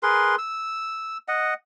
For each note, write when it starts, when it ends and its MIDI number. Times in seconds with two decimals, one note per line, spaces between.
0.03 0.36 68
0.03 0.36 70
0.03 0.36 71
0.03 0.36 84
0.38 1.18 88
1.28 1.54 75
1.28 1.54 78